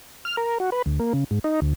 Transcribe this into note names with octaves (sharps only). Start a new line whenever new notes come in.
F6
A#4
F#4
B4
D2
A#3
C#3
G#2
D#4
D2